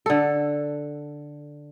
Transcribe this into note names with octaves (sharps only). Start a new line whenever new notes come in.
D3 A4